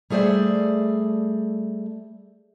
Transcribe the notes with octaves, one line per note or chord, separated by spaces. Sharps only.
G3 A3 G#4 C5 D5 E5